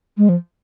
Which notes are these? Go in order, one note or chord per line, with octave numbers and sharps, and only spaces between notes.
G#3
F3